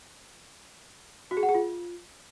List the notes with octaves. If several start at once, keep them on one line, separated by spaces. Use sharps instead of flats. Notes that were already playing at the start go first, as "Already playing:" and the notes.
F#4
G#4
F#5
G#4
F4